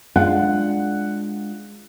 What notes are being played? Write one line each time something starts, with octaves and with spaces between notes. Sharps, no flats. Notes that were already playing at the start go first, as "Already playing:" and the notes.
G#3 D4 F4 F#5